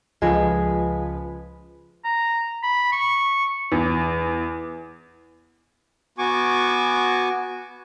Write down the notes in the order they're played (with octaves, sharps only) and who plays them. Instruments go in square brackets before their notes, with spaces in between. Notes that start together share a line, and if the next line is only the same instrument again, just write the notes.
[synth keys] C#2 F3 B4 [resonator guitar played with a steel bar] G#3
[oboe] A#5
B5
C#6
[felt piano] E2
[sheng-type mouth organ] B3 F#4 G#5 C#6 D6